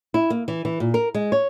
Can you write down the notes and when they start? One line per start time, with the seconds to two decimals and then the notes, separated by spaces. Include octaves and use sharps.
0.14 E4
0.30 A#3
0.48 E3
0.65 E3
0.80 A#2
0.94 A#4
1.14 G#3
1.32 C#5